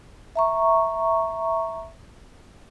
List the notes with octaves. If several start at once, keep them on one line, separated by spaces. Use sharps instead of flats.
E5 A#5 C#6